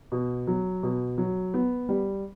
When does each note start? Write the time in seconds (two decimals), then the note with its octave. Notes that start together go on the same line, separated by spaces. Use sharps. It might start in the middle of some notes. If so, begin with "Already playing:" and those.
0.12 B2
0.47 F#3
0.83 B2
1.18 F#3
1.54 B3
1.89 G3